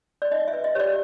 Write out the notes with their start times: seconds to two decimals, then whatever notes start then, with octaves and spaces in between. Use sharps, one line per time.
0.22 D5
0.31 D#4 D#5
0.48 E5
0.53 B4
0.64 D#5
0.75 G4 C#5
0.80 D5